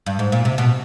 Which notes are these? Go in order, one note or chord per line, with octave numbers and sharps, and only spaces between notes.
G2
G#2
A#2
C3
B2